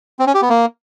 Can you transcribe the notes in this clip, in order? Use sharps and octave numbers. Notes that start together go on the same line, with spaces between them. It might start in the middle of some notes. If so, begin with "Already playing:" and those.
C4
C#4
G4
B3
A#3